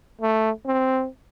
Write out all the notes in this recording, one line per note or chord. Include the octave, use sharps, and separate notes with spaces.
A3
C4